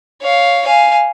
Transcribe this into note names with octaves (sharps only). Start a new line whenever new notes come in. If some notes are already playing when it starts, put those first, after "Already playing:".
C#5 F5
F5 G#5